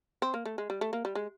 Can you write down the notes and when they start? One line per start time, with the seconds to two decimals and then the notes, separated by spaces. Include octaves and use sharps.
0.22 C4
0.34 A#3
0.45 A3
0.58 G#3
0.70 G3
0.81 A3
0.93 A#3
1.05 G3
1.15 G#3